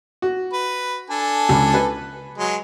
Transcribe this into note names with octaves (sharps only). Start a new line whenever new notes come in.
F#4
B4
D4 A4 G#5
C#2
B4
F#3 G#3